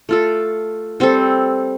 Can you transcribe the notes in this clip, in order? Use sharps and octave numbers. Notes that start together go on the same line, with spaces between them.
A3 F4 A4
G3 C4 A4